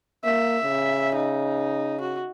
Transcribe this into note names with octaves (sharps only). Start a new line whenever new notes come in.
A#3 E5
C#3
D#4
F#4